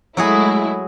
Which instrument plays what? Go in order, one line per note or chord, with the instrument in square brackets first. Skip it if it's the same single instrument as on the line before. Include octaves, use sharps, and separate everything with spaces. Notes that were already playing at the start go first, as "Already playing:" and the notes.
[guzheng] F#3 F#4 G#4 [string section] G#3 A3 E4